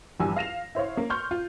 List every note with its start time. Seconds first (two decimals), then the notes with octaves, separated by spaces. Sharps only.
0.20 A#1 E2 G2 G#5 E6
0.36 F5 A#6 E7 F7
0.75 E4 C5 C#5 F5
0.97 A#3
1.10 C6 C#6 F6 G6
1.31 F4